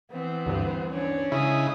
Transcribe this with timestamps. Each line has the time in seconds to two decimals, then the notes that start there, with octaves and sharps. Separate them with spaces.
0.12 E3 B3 C4
0.46 D2 G2
0.89 C#4 D4
1.32 C#3 G#3 E4 D#6